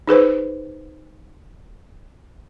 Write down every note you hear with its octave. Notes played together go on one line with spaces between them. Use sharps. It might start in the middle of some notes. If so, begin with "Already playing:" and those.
D#4 G#4 B4 C5